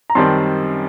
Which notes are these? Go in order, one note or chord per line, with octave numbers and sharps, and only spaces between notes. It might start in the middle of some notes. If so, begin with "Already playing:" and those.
A#5
F#2 D#3 G3 C4 A5 C6